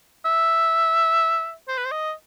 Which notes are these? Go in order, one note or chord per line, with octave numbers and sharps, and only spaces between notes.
E5
C5
B4
C5
D#5